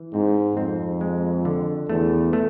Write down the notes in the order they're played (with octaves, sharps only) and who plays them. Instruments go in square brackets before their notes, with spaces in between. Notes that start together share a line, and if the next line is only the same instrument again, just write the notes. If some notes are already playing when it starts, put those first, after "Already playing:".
Already playing: [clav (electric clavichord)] E3
[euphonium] G#2 [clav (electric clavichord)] C4
[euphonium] F2 [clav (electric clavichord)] C4
[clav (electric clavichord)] G#3
D3
[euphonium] E2 [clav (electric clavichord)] A3
[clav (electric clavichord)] A3